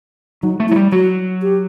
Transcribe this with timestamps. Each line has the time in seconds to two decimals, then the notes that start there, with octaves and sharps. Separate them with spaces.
0.43 F#3 D#4
0.60 A3
0.68 E4
0.71 F#3
0.76 G3
0.92 F#3 F#4
1.42 G4